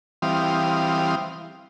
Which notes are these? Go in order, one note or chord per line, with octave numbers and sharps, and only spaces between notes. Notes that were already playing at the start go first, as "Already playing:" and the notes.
E3 G3 C4 F5 D#6